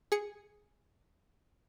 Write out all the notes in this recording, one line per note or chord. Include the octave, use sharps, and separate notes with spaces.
G#4 C#7